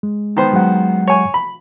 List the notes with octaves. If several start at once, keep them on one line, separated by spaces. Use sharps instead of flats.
G#3
D#3 B3 C5
F#3 G#3 F#5
C#5 G#5 C#6
B5